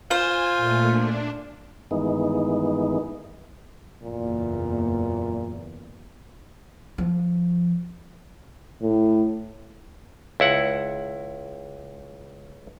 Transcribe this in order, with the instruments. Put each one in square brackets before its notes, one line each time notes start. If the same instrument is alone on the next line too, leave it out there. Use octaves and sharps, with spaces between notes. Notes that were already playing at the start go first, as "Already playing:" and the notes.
[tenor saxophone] F4 [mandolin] C5 [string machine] G#5
[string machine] A#2 A3
D4
[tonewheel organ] G2 D#3 E3 G#3 B3 D#4
[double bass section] F#1 E2 [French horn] A#2
[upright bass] F3
[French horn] A2
[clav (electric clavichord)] C#2 E4 F#5